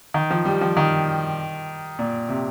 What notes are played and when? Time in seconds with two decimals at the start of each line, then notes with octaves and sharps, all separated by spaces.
0.14 D#3
0.30 F3
0.45 G3
0.61 F3
0.77 D#3
1.99 A#2
2.29 C3